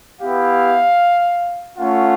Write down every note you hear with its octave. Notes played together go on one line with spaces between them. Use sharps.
B3 E4 G4 F5
A3 C#4 F4 F#5